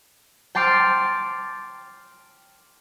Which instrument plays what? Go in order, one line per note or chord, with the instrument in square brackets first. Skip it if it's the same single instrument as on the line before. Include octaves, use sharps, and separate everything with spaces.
[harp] G5 A5 C6 D6 F6 A6